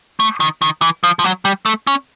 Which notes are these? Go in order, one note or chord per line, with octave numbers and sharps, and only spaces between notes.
A3
D#3
D#3
E3
F3
F3
F#3
G3
A3
C#4